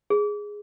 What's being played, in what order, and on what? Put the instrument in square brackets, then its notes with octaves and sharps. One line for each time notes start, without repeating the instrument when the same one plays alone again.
[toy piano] G#4